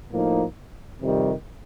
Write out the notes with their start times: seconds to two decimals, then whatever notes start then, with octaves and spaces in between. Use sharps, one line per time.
0.12 A2 F3 A#3 D#4
1.01 F2 C3 D#3 G3